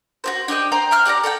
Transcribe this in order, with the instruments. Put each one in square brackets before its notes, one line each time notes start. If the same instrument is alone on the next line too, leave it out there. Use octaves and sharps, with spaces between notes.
[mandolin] F#4 G4 C5
D4 G4 D#5 G5
C5 G5 A#5 C6
E5 G5 F6 F#6
D4 G4 D5 A#5
A4 D5 F#5 G5